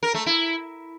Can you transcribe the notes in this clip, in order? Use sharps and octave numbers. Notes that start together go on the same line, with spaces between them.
A#4
A3
E4